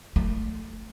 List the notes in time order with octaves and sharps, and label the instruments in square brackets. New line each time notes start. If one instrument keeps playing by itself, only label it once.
[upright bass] A3